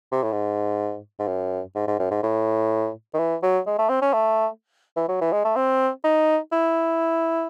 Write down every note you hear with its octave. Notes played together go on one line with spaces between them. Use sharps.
C3
A2
G#2
G#2
F#2
G#2
G#2
F#2
G#2
A2
D#3
E3
F#3
G#3
A3
C4
C#4
A3
E3
F#3
E3
G#3
A3
C4
D#4
E4